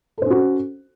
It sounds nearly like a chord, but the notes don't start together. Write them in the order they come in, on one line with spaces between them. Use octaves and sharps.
A4 C5 C#4 F#4